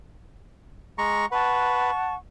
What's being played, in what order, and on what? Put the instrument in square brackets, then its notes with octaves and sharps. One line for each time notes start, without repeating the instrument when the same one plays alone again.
[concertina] G#3 A#5 C#6
[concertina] B4 [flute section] F#5 A5 C#6